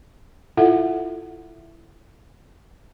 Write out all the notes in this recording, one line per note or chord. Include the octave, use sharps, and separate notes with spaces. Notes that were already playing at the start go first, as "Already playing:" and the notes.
E4 F4 A4 E5 F#5